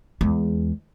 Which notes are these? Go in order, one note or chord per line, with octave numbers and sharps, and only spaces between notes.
E2 G#3